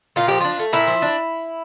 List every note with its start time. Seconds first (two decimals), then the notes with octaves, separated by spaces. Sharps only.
0.16 A#2 F4
0.28 F3 G4
0.41 D4 F4
0.59 A3
0.73 A#2 E4
0.87 F3
1.02 D4